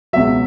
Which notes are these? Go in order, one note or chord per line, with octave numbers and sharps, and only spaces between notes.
C#2 B2 F#3 E5